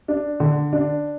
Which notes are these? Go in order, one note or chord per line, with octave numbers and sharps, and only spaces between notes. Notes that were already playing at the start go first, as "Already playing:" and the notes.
D4
D3
D4